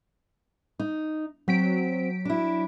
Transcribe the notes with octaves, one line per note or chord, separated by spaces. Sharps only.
D#4
F#3 C4 B6 D7
D4 E4